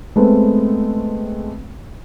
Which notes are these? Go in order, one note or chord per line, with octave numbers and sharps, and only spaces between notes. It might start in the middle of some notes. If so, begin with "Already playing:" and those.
G#3 A3 B3 C4